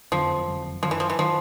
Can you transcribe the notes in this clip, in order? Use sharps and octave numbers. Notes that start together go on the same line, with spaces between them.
F#1 F2 D3 F3 F#3
F#1 F2 D3 F#3
F#2 D#3 F3 F#3
E3
F3
E3
D#3 F3 F#3